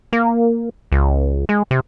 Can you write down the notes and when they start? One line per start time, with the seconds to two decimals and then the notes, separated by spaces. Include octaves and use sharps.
0.13 A#3
0.92 C#2
1.49 G#3
1.71 C3